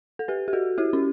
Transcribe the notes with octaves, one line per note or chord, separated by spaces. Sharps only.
A4
G4 B4
G4
F#4 A4
E4 G4
C#4